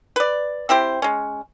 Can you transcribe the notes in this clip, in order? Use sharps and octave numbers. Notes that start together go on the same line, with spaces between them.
B4 D5
C4 E4 G4 C5
G#3 C#4